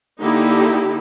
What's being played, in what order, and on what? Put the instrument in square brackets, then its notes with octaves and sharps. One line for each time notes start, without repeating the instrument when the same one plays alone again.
[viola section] D3 A#3 D#4 E4 G4